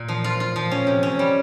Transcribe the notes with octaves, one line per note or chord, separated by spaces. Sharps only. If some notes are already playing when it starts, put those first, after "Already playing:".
Already playing: A#2
F3
F4
F4
F3
C#4
C3
C#4
G3